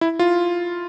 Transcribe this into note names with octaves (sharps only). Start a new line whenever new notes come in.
E4
F4